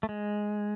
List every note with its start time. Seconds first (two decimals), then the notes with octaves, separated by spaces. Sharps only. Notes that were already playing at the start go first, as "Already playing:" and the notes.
0.03 A3
0.09 G#3